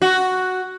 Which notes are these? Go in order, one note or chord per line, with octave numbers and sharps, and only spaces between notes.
F#4